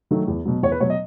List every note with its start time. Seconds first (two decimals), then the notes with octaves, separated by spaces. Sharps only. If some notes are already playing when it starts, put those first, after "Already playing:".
0.11 D#3 F#3 A3
0.28 E2
0.45 B2 F#3
0.63 E2 C#5
0.72 B4
0.80 B2 F#3 C#5
0.90 D#5